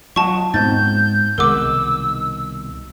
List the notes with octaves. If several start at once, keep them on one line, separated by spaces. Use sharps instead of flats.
F#3 F4 F#4 D#5 A5 C#6
G#2 B3 C4 D#4 G6 A6
C2 B2 D#3 G#3 A#4 F#5 D6 E6